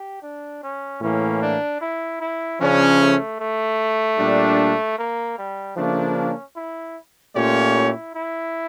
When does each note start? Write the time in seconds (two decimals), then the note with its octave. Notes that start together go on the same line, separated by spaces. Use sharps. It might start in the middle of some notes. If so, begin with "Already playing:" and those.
Already playing: G4
0.22 D4
0.63 C#4
1.02 A2 E3 A#3 C#4
1.42 D4
1.81 E4
2.21 E4
2.61 C#3 F3 C#4 D4
3.00 A3
3.40 A3
4.19 A#2 G3 D4
4.99 A#3
5.38 G3
5.77 C#3 F3 A3 A#3 D4
6.17 C#4
6.56 E4
7.36 A#2 A3 C#4 F4 G4 C#5
7.75 E4
8.15 E4